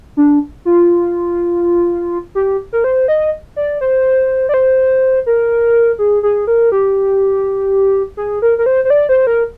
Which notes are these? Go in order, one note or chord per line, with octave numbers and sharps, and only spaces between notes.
D4
F4
G4
A#4
C5
D#5
D5
C5
D5
C5
A#4
G#4
G#4
A#4
G4
G#4
A#4
A#4
C5
C5
D5
C5
A#4